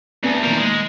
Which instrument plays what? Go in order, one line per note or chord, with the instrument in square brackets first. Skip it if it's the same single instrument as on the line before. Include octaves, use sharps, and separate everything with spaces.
[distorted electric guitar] D2 [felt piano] B3 G#5
[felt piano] A#2 D#3 [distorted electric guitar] G3 A#4
[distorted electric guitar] G#3